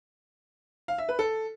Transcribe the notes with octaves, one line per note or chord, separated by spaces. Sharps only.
F5
E5
B4
A4